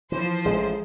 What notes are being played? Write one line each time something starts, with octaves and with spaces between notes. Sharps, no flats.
E3 F3 C5
A1 G#3